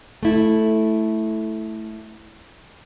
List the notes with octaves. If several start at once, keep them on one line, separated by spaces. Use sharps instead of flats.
A3 E4